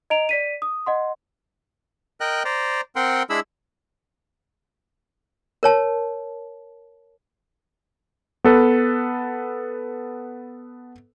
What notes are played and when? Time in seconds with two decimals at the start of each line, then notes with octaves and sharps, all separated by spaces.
0.10 D#5 A#5 D7 F7
0.29 D5 B6 D#7
0.62 D#6
0.86 D#5 F#5 C6
2.21 A#4 D#5 G5 F#6
2.45 C5 D5 A#5
2.96 C4 A#4 F#5 G5 C6
3.30 G#3 D4 E4 G#4 B5 E6
5.63 A#4 C#5 A5
8.44 B3 A4 B4